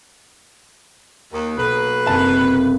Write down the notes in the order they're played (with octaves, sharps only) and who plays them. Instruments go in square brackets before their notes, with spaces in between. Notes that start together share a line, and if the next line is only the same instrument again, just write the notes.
[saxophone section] D#2 [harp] A#5 D#6 D7
[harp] B1 [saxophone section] A#3 F#4 B4
[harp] F#1 [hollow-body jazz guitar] C3 A5